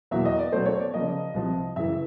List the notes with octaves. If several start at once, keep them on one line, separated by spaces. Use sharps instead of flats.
E2 B2 F#3 A#3 E5
D#5
D5
B2 F#3 A3 C#4 C5
C#5
D5
C#3 F3 A#3 D#5
C2 C3 F3
F#2 C#3 E3 E5